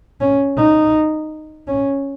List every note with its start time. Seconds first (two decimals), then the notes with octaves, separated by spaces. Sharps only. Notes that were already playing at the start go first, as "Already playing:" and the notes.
0.21 C#4
0.58 D#4
1.67 C#4